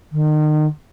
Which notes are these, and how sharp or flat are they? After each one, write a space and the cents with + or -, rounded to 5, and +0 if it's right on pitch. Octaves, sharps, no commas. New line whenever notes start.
D#3 -35